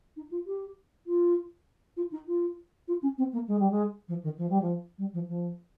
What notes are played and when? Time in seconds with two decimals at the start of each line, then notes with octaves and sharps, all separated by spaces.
0.16 D#4
0.31 F4
0.47 G4
1.07 F4
1.97 F4
2.12 D#4
2.28 F4
2.88 F4
3.02 C#4
3.18 C4
3.33 A#3
3.48 G#3
3.59 G3
3.71 G#3
4.08 F3
4.23 D#3
4.38 F3
4.49 G3
4.61 F3
4.98 G3
5.14 F3
5.29 F3